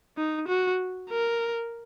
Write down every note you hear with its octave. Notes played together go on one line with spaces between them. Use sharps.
D#4
F#4
A#4